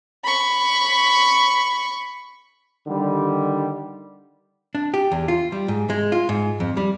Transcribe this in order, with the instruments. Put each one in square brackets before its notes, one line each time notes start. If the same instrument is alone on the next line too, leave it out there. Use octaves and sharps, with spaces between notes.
[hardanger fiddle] B5 C#6
[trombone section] D3 D#3 G3
[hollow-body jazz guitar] D4
G4
E2
F4
G3
G#2
G#3
F4
G#2
F2
G3